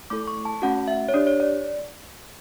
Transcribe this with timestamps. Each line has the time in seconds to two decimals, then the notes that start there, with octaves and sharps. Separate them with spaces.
0.10 A3 E4 A4 D6
0.27 C#6
0.45 A5
0.62 A3 C#4 F#4 F#5
0.88 E5
1.09 C#5
1.14 D4 G4 D5
1.27 C#5
1.40 D5